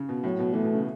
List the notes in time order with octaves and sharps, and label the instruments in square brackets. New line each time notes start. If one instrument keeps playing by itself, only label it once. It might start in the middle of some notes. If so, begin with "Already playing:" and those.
Already playing: [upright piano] C#3
B2
[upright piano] A2 [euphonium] F#3
[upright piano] B2
[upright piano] E3 [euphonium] A3
[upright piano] B2
C#3